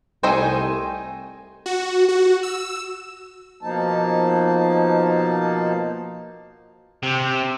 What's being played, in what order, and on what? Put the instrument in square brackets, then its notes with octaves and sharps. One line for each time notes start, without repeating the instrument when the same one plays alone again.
[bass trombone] C2 [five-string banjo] A3 D#4 C5 [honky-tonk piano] G5 G#5
[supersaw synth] F#4
F#4
E6
[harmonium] B2 F3 A#3 D#4 A5
[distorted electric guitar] C3